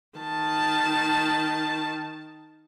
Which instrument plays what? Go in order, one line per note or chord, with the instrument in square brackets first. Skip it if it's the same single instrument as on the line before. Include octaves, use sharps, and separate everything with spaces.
[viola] D#3 A5